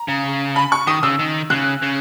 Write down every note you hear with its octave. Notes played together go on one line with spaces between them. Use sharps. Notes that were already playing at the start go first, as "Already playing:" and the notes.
Already playing: A#5
C#3
B5
C#6
D#3 D#6
C#3 E6
D#3
C#3 F#6
C#3